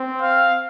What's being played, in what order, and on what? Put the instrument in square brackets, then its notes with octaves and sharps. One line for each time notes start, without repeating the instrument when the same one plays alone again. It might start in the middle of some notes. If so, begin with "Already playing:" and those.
Already playing: [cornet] C4
[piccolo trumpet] F5